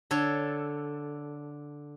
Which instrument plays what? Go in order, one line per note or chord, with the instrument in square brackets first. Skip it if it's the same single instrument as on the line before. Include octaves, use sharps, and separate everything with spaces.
[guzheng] D3 A4 C#5